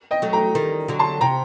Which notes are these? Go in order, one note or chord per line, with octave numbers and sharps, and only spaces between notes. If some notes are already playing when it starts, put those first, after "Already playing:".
D#5 G5
F#3 A3
G5 A#5
D#3 G3
D3 F#3
A5 C6
C3 G5 A#5